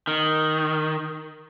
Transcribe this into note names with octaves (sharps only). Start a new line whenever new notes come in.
D#3